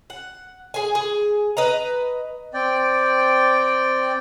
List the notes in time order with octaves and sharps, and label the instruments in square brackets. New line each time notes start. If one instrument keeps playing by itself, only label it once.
[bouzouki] F#5
G#4 G#5
G#4
B4 D#5 A#5
[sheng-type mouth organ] C4 D5 G5